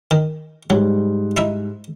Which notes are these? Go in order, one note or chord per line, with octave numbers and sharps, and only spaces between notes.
D#3
G#2 F#3 G3
D#4 E4 E5